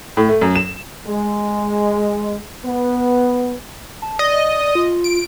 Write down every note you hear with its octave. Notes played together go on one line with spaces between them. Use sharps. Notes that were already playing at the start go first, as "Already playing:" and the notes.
A2
A3
F#2
E7
G#3
B3
A5
D5 D#5
F4
D7